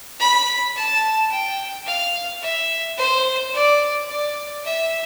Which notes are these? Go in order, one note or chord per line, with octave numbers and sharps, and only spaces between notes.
B5
A5
G5
F5
E5
C5
D5
D5
E5